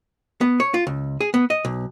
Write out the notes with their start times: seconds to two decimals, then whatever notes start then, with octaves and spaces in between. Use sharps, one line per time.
0.41 B3
0.60 C#5
0.74 F4
0.87 C#2
1.21 G#4
1.34 B3
1.50 D#5
1.65 B1